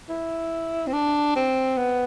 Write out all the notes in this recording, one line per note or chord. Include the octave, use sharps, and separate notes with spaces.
E4
C4
D4
C4
B3